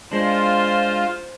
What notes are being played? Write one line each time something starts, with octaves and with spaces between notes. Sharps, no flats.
G#3 D4 F4 C5